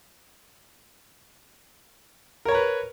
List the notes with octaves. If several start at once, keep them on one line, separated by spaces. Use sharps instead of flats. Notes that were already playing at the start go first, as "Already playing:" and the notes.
A#4 B4 C#5 A#5